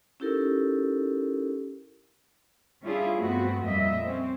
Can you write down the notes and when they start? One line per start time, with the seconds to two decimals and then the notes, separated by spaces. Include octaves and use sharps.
0.20 C#4 D#4 E4 G4 A4 A#4
2.83 G3 C#4 D4 E4 F4 G#4
3.19 G2 A3 B3 C4 F#4
3.63 F2 A#2 G3 A#3 D#5 E5
4.04 C4 C#4